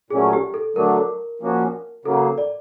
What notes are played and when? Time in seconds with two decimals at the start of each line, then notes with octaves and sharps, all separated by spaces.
0.10 A#2 F#3 A3 C#4 G#4
0.33 G4
0.54 A4
0.75 D3 F#3 A3 D4 A#4
1.40 A#2 F3 A#3 C#4 F#4
2.05 C#3 F#3 A#3 A4
2.38 D5